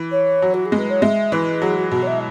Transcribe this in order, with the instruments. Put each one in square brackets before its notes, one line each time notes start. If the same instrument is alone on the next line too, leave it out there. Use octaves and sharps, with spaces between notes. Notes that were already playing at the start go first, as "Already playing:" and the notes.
Already playing: [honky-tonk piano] E3
[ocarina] C#5
[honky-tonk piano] F#3
[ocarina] F#4
G#4
[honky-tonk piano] G#3
[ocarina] B4
C#5
[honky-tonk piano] G#3 [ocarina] E5
[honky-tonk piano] E3 [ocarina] B4
[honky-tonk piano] F#3 [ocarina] G#4
[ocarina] F#4
[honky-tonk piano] B2 [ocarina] F#4
[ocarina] C#5
E5